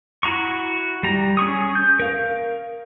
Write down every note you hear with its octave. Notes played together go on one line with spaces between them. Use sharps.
E4 F#4 A#5 C#6
G3 A#5
C#4 G#4 C#6 D#6
G6
A#4 F5